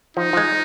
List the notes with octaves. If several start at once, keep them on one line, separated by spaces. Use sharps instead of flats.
F3 D#4
F3
G#3